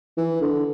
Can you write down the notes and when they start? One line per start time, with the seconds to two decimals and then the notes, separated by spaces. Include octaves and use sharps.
0.17 E3
0.41 D3